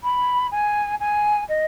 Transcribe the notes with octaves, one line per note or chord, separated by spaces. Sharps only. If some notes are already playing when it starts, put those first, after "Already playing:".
B5
G#5
G#5
D#5